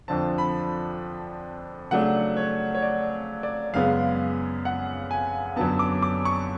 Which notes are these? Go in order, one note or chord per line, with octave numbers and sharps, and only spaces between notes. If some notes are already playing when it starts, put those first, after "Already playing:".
F2 D3 F3 A5
B5
C#3 F#3 A3 D4 F#5
C#5
C#5
D5
D5
F#2 C#3 G#3 B3 F5
F#5
G#5
F#2 D3 F#3 B3 A5
D6
D6
C#6